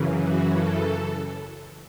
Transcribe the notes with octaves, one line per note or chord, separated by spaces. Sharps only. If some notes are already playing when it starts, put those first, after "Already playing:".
Already playing: F#2 C#3 E3
F#4
A4